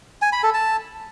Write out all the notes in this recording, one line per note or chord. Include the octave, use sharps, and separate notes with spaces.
G#5
B5
A4
A5